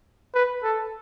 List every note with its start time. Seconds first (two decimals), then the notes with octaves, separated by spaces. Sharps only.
0.34 B4
0.63 A4